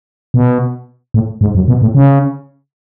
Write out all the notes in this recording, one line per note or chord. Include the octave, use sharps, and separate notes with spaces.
B2
A2
G#2
F#2
B2
A2
C#3